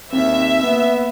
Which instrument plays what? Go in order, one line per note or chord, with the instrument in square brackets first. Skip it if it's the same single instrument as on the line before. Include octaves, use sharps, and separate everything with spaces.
[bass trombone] D#2 [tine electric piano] C4 [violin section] E5
[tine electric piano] A#3 [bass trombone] B3